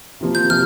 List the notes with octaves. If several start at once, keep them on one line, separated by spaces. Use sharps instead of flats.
C2 C3 F3 A#3
G6
C3 F3 F6